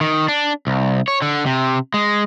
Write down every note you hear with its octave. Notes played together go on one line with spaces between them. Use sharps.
D#3
D4
C2
C#5
D3
C3
G#3